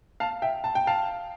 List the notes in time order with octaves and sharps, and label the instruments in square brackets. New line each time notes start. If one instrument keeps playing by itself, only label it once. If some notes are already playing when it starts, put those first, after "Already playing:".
[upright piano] F5 A5
E5 G5
A5
G5
F5 A5